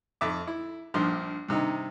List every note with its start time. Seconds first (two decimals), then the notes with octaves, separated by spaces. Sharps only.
0.21 F2 E5 D6
0.47 E4
0.94 A#1 G2 F3 C6
1.49 G2 C3 D#3 D#4